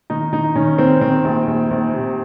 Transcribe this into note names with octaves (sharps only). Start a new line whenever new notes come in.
D#3 D#4
D#3 D#4
D#3 C#4
D#3 C4
D#3 C4
A#1
A#1
A#1
C3